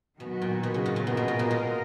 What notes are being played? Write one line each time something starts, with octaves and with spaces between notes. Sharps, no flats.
B2 D#3 F#3 B3 F#4
A#2
B2
C#3
A#2
A#2
B2 A#3 F4 A#4 D#5
B2
A#2
B2
A#2